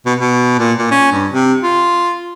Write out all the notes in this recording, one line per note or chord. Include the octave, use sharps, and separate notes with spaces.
B2
B2
A#2
A#2
C#4
G2
C3
F4